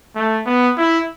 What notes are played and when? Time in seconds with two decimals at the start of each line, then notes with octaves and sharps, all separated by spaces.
0.16 A3
0.46 B3
0.78 E4